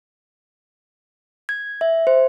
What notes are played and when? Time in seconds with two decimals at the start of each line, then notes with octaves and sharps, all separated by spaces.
1.49 G#6
1.81 E5
2.07 C5